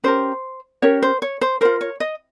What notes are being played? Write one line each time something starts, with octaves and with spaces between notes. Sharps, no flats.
C#4 G4 A#4 C5
C#4 G4 A#4 C#5
C5
C#5
C5
F4 A#4 C5
C#5
D#5